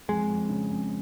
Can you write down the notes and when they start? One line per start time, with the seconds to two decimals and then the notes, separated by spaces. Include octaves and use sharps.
0.08 F2 G#3
0.30 F2
0.50 C#3
0.70 F2